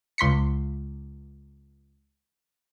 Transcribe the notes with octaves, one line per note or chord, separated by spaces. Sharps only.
C#2 C6 B6 C#7